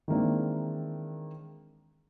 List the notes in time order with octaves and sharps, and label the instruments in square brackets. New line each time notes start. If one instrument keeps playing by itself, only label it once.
[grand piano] D#3 E3 G#3 A#3 C4 D4